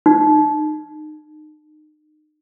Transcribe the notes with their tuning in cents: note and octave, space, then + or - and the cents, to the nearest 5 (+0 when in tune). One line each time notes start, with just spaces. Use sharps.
D#4 -30